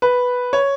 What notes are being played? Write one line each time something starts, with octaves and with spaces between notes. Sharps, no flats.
B4
C#5